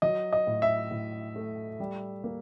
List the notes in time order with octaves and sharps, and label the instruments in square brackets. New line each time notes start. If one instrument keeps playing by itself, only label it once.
[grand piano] F#3 D#5
D#5
A2
E5
A2
A3
G3
A#3